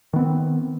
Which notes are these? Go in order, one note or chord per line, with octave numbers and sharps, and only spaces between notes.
D#3 B3 C4